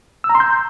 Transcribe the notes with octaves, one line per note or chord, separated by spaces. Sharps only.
E6
A#5
C6
G6